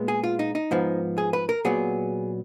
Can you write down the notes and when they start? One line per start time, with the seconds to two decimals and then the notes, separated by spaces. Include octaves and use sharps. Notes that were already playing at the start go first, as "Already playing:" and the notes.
Already playing: A#2 G#3 B3
0.08 G#4
0.23 F4
0.39 D#4
0.55 D#4
0.71 G#2 F3 B3
1.18 G#4
1.33 B4
1.49 A#4
1.65 A#2 F#3 B3 G#4